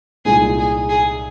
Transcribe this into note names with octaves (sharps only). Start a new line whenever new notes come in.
C2 A#2 G#3 D#4 G#4
G#4
G#4